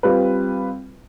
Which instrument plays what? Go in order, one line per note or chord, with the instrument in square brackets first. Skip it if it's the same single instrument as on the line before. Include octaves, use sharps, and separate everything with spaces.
[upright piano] G3 C4 F4 B4